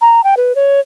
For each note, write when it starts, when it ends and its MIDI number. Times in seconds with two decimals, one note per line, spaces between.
0.01 0.24 82
0.24 0.35 79
0.37 0.55 71
0.56 0.80 73